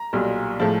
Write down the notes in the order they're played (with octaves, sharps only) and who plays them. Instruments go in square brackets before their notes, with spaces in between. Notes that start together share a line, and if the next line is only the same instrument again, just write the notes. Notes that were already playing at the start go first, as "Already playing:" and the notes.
Already playing: [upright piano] A#5
B1 A#2 G3
A2 F3 G#3 A5